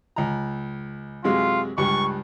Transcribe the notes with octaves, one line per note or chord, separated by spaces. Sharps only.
C#2 A#5
F#2 C3 G#3 F4
C#2 G2 G3 C#6